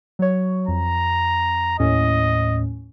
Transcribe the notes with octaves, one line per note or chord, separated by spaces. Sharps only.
F#3 C#5
F2 A#5
D#2 A2 C#4 D#5